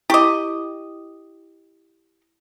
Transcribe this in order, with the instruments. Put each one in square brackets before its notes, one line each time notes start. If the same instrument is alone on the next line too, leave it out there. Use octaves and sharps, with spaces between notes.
[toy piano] E4 C#6 D6 [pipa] G4 D#5